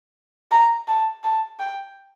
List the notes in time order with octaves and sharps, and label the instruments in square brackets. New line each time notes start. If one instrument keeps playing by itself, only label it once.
[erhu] A#5
A5
A5
G5